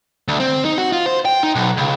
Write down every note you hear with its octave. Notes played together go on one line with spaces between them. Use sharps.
D2
C4
D#4
F#4
F4
C5
G5
D#4
B1
C#2